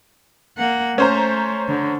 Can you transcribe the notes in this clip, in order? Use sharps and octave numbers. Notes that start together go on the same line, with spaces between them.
A#3 F#5
A3 C#4 C5 A#5
D3